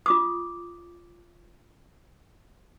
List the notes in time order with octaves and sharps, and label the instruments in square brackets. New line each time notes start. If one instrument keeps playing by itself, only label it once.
[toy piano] F4 D6 D#6